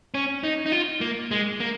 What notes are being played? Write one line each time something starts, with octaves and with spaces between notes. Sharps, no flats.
C#4
D#4
D#4
F4
A#3
G#3
A#3